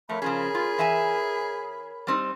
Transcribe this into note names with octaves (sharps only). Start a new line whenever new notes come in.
F2 A3 A#4 C#5 B5
C#3 F3 C#4 G#4
F4
E3 E5 G#5
G3 C4 D#4